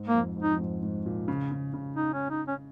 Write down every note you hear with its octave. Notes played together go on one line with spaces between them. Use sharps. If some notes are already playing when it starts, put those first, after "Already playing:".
Already playing: G#2
A#3
F2
G#2
D#4
F2
G#2
G#2
A#2
C#3
C#3
C#3
D#4
C#4
D#4
C#4